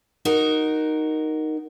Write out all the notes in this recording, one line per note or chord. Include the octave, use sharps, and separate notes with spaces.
D#4 F#4 A#4